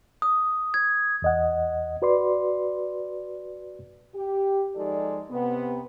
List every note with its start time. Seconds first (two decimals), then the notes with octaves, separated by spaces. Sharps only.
0.22 D#6
0.74 G#6
1.22 E2 D#5 F#5
2.02 F#4 B4 D5 C6
4.15 G4
4.76 F3 G#3 D#4 A4 D5
5.31 C3 B3